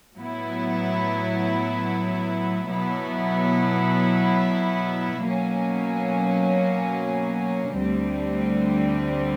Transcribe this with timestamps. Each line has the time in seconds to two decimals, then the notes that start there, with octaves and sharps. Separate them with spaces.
0.17 A2 F#3 B3 E4
2.70 B2 F#3 B3 E4
5.24 B2 F#3 A#3 C#4
7.77 D2 D3 G3 C4